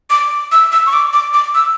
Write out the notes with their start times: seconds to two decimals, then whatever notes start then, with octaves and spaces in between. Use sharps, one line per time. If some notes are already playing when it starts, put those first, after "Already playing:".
0.10 D6
0.52 E6
0.72 E6
0.86 C#6
0.93 D6
1.13 D6
1.34 D6
1.55 E6